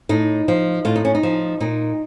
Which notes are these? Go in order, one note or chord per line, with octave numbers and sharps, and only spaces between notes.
A2 D#4
F3
A2 F4
D#4
C#4
D#4
F3
A#2 D#4